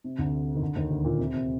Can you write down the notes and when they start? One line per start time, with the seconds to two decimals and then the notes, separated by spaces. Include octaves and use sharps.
0.04 C3
0.19 D2 D3
0.55 D#3
0.62 D2 D3
0.76 D#2 D#3
0.91 D2 D3
1.05 A#2
1.19 C3
1.33 C3